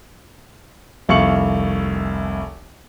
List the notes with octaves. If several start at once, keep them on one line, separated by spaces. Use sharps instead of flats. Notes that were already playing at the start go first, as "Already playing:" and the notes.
F1 C2 F5 C#6 C#7 F#7